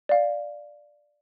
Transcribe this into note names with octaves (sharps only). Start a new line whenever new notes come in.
D5 F5